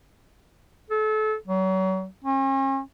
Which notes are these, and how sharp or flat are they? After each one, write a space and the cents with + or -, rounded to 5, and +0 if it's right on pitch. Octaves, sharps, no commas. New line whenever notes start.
A4 -30
F#3 +35
C#4 -45